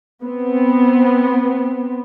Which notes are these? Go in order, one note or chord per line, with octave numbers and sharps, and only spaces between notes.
B3 C4